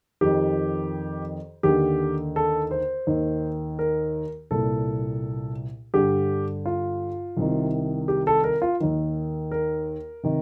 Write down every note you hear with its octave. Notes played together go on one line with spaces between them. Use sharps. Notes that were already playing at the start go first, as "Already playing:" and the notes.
F2 D#3 G4
D#2 D3 G4
A4
C5
D#2 D#3
A#4
C2 A#2 A4
G2 D3 G4
F4
C2 C3 D#3
G4
A4
A#4
F4
D#2 D#3
A#4
C3 D#3